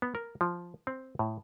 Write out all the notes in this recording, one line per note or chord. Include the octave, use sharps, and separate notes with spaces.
B3
A#4
F3
C4
A2